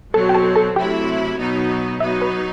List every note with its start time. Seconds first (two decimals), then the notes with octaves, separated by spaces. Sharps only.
0.14 B2 F#3 C4 A4 A5
0.29 G5
0.34 A4 A5
0.56 A4 A5
0.76 C3 F#3 A3 E4 G4 G5
1.39 B2 F#3 B3 D#4
2.00 F#3 B3 D#4 E5
2.21 B4 B5